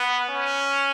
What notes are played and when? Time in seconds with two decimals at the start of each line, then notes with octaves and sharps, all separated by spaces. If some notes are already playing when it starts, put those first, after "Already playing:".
Already playing: B3
0.28 C#4